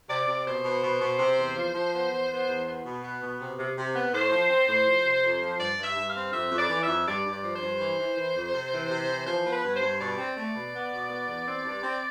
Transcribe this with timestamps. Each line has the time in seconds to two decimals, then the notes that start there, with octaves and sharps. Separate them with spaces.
0.09 C3 D5
0.28 C3
0.46 B2 C5
0.64 B2
0.83 B2
1.01 B2
1.19 C3
1.38 E2
1.56 F3
1.74 F3
1.93 B3
2.11 E2
2.30 B3
2.48 E2
2.66 B3
2.85 B2
3.03 B3
3.22 B2
3.40 C3
3.59 C3
3.77 C3
3.94 B3
4.13 A2 C5
4.32 F3
4.50 C4
4.68 A2
4.86 F3
5.05 C3
5.23 F2
5.41 F3
5.59 G2 D5
5.78 G2
5.84 E5
5.96 G2
6.09 F5
6.15 C4
6.32 F2 E5
6.51 F2
6.58 D5
6.70 E3
6.82 F2 E5
7.06 G2 D5
7.25 G2
7.31 D5
7.43 F3
7.55 C5
7.61 G2
7.79 E3
7.99 E3
8.17 E3
8.35 F2
8.53 C3
8.72 E3
8.90 C3
9.08 E3
9.26 F3 C5
9.45 B3
9.51 B4
9.63 G2
9.75 C5
9.81 G2
10.00 B2 D5
10.18 C4
10.37 A3
10.55 B2
10.74 B3
10.92 B2
11.10 B3
11.28 E2
11.46 C4
11.64 G2
11.83 C4